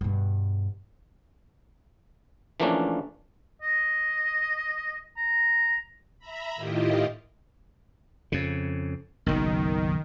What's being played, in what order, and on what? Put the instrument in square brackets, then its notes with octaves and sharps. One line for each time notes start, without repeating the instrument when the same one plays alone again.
[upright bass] G2 B2
[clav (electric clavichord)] E3 F3 A3 A#3 C#4 D4
[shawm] D#5
A#5
[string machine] E5 A#5 B5
A2 D#3 E4 F4 G4 D#5
[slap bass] F2 C#3
[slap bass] F#1 B1 [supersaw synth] D#3